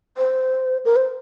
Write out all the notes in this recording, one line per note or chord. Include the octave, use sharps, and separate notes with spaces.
C5
A#4
C5